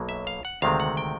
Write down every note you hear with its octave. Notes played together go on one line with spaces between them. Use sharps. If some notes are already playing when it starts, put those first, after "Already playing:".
Already playing: B1 B2 F#3 A#3
E5
F5
F#5
D2 C3 D#3 G#3 C4 F5
F#5
G5